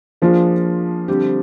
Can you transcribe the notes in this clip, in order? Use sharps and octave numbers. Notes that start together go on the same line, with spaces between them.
F3 A#3 D4 F4 G#4
D3 G3 C4 G4